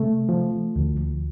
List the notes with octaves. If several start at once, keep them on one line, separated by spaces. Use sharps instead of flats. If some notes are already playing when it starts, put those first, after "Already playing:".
Already playing: C3 A3
F3
D2